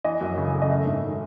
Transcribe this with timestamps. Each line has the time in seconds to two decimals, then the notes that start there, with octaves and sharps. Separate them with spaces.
0.04 E3 D#5
0.21 F#2
0.37 C#3
0.54 A3
0.62 D#5
0.70 A3 E5
0.86 G#2
1.02 D#3